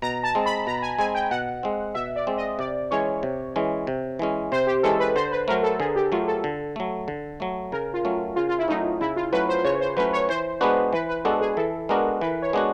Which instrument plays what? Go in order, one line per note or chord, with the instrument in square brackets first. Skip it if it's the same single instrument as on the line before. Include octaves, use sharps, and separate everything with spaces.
[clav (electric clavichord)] B2 [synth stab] A#5
[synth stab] A5
[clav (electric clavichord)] G#3 C4
[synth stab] B5
[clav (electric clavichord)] B2 [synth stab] A#5
[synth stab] G#5
[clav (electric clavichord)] G#3 C4 [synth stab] G#5
[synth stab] G5
[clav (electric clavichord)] B2 [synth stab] F#5
[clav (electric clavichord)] G#3 C4
[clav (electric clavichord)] B2 [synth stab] E5
[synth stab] D5
[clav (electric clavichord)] G#3 C4
[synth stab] D#5
[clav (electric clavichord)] C3 [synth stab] D5
[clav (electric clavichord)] E3 G#3 C#4 [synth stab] C#5
[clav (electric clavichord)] C3
E3 G#3 C#4
C3
E3 G#3 C#4
[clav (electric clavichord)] C3 [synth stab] C5
[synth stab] G4
[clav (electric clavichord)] E3 G#3 C#4 [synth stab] A4
[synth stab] B4
[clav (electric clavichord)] D3 [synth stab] C5
[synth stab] B4
[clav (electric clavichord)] F#3 A3 [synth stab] A#4
[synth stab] A4
[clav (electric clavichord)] D3 [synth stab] G#4
[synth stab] G4
[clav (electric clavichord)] F#3 A3 [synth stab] F4
[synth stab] A4
[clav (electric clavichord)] D3
F#3 A3
D3
F#3 A3
[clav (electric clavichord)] C#3 [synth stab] A#4
[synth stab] F4
[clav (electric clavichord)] F#3 A3 C#4
[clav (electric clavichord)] C#3 [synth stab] F4
[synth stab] F4
E4
[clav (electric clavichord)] F#3 A3 C#4 [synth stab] D#4
[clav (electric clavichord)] C#3 [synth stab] E4
[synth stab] F4
[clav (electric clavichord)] F#3 A3 C#4 [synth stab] B4
[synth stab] C5
[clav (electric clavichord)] C#3 [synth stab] C#5
[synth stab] C5
[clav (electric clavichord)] F#3 A3 C#4 [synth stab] B4
[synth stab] C#5
[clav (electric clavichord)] E3 [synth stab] C5
[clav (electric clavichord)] G#3 B3 D4 F#4 [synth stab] B4
[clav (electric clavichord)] E3 [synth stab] B4
[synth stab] B4
[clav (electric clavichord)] G#3 B3 D4 F#4 [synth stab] A4
[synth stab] G#4
[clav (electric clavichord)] E3 [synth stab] A4
[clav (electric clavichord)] G#3 B3 D4 F#4 [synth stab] A#4
[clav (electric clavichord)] E3 [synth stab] B4
[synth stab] C#5
[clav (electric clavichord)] G#3 B3 D4 F#4